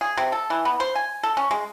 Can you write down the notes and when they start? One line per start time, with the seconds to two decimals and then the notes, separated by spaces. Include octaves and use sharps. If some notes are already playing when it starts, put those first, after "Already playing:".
0.01 G#4
0.17 C3
0.32 A4
0.50 E3
0.65 B3
0.80 C5
0.95 G#5
1.23 A4
1.37 C#4
1.51 G#3